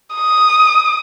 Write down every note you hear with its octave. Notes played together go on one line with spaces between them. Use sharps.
D#6